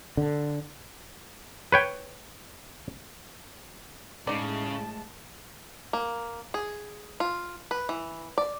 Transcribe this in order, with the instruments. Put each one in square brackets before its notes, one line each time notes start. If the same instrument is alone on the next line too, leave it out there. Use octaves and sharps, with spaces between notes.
[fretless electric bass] D3
[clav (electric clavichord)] B4 C#5 G5
[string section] A2 [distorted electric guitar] C#3 [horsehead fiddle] G#3 A5 [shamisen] D#4 D5
[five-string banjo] A#3
G#4
F4
B4
E3
D5